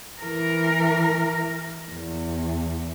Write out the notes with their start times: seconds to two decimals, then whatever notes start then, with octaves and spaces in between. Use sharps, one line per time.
0.21 E3 A#4
1.92 E2